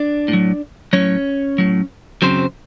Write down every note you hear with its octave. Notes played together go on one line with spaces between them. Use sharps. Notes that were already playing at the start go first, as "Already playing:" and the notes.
Already playing: D4 D5
A2
F#3
A2 F#3 C#4 C#5
A2 F#3
F#2 C#3 F#3 C4 C5